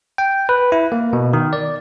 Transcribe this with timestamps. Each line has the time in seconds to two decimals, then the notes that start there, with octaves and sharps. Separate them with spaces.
0.18 G5
0.49 B4
0.72 E4
0.92 A#3
1.13 B2
1.33 D#3
1.53 D5